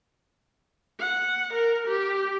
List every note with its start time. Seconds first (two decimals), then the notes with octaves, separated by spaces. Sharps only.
0.99 F#5
1.53 A#4
1.87 G4